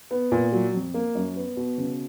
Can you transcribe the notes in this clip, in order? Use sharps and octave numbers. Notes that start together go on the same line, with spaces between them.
B3
A#2
F#3
F2
A#3
F#2
B3
B2
C#3